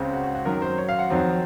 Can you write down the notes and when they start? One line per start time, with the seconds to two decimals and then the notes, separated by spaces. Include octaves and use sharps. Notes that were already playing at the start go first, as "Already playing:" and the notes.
Already playing: C#2 C#3 G#3 C4
0.13 F#4
0.24 F#4
0.35 F#4
0.45 F#2 D#3 F#3 A#4
0.62 C5
0.78 C#5
0.89 F5
0.99 F#5
1.10 F2 D#3 F#3 C4